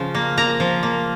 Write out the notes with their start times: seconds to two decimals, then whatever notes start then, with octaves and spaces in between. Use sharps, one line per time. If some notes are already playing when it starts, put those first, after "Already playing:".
Already playing: C#3 F3
0.15 A#3
0.37 A#3 A#5
0.60 F3
0.83 A#3